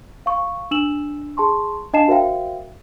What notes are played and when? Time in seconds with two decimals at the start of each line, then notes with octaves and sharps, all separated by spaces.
0.26 F5 C#6
0.71 D4 E6 E7 F#7
1.37 G#4 A5 C6 C#6
1.93 D4 D#5 F5 A5 C7 E7
2.08 F#4 A#4 C5 E5 F5 G5